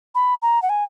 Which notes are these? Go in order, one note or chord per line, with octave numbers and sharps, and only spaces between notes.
B5
A#5
F#5
G#5